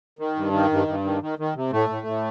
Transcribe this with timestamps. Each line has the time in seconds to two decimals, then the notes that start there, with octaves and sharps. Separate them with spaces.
0.19 D#3
0.36 G2
0.53 D#3
0.70 G2
0.88 G2
1.04 D#3
1.22 D#3
1.39 D#3
1.56 C3
1.72 A2 A3
1.89 A2
2.07 A2